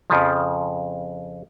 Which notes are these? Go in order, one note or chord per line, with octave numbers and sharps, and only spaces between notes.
F2 C#3 F3